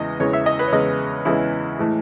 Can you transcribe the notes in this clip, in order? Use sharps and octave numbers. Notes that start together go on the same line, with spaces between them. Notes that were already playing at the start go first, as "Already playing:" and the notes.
Already playing: E2 C#3 E3 G#3 D#5
E2 C#3 E3 G#3 C#5
E5
D#5
B4
C#5
E2 C#3 E3 G#3 D#5
E2 C#3 E3 G#3 E4
A2 E3 G#3